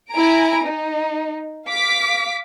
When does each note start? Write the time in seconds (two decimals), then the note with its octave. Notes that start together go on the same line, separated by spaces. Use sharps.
0.11 E4 G#5 A#5 D7
0.65 D#4
1.68 F5 D6 B6